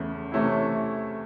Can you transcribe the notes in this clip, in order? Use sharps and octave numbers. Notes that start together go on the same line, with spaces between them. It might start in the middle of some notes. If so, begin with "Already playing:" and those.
Already playing: E2 C#3 A3
C3 E3 A3 C#4 E4